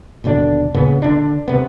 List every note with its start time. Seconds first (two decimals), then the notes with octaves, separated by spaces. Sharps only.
0.24 D#1 B2 D3 D4
0.74 A#2 C#3 B3
1.02 D3 D4
1.48 C3 B3